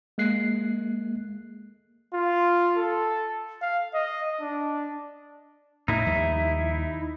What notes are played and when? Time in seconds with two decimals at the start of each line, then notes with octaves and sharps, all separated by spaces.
0.18 G#3 A#3 F#6 C7
2.14 F4
2.77 A4
3.62 F5
3.94 D#5
4.41 D4
5.88 A2 A3 D#4 E4
6.07 D#2 F3 G3